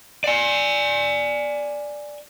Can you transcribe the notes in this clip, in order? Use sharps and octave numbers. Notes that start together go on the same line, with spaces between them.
D5 G#5